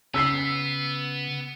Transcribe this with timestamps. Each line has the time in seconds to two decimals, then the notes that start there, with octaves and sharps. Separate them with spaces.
0.14 C#3 B3 E6 B6 C7